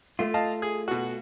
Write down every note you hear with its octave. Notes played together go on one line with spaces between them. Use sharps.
A3 F4
D#5 F5 A5
G#4
B2 F#4